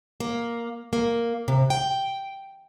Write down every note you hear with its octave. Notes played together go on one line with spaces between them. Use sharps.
A#3
A#3
C3
G5